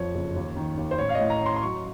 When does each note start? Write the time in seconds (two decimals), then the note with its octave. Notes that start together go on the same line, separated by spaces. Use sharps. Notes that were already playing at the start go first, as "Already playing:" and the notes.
Already playing: F2 F3 C#5
0.14 F#1
0.36 D#2
0.56 D#3
0.77 D#2
0.91 C5
0.98 A1 C#5
1.09 F5
1.15 A2 D#5
1.30 A#5
1.40 A1
1.46 C6
1.56 C6
1.61 F#3 C#6